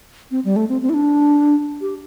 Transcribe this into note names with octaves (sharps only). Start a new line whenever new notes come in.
C4
G3
A3
C4
C4
E4
D4
G4